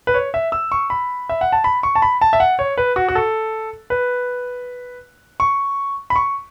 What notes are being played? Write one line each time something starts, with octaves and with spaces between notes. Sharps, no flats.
B4
C#5
E5
E6
C#6
B5
E5
F#5
A5
B5
C#6
A5
B5
A5
E5
F#5
C#5
B4
F#4
F#4
A4
B4
C#6
B5
C#6